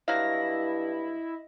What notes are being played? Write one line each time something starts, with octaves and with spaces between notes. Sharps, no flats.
G2 F#3 E4 D#5 F5 A#6